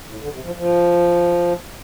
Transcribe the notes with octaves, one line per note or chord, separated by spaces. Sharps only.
A2
D3
C3
F3
F3